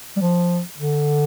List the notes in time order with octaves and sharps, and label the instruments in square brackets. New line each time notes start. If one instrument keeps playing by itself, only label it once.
[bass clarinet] G3
F3
D3